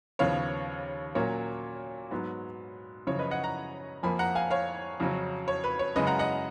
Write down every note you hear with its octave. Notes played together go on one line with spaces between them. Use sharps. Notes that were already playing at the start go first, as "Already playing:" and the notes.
D#2 C#3 F3 B3 C#5 F5
A#2 F#3 A#3 C#4 C#5
G#2 F#3 B3
F#2 C#3 F3 C#5
B4 D#5
D#5 F#5
F#5 A#5
F2 F3 A#3 G#5 B5
F#5 A#5
F5 G#5
C#5 F5
F2 C#3 F#3 C#4
C#5
B4
C#5
F#2 C#3 G#3 B4 D#5
F#5 A#5
D#5 F#5